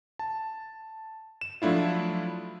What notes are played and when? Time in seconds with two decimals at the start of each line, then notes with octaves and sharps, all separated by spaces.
0.19 A5
1.41 E7
1.62 F3 F#3 A3 D4 E4 F4